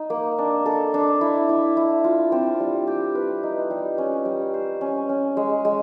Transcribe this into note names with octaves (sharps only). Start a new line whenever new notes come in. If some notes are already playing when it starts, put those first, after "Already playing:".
Already playing: D#4
A#3
D4
A4
D4
E4
E4
E4
F4
C4
G3
G4
B4
D#4
G3
C#4
G3
C5
C#4
C#4
G#3
G#3